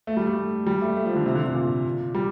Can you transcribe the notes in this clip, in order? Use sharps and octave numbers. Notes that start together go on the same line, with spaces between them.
A3
G3
A3
G3
A3
A3
F3
D3
C3
D3
D3
A#2
G3